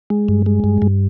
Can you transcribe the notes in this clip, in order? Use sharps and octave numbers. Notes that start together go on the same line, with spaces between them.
G#3
G2
G#3
G2
G2